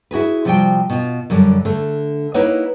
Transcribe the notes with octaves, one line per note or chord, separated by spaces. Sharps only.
E4 F#4 G#4 B4
C3 F3 G3 F4 F#4 G5
B2 F4
F#2 D3 G3
D3 A3
A#3 D#4 E4 B4 C#5 F#5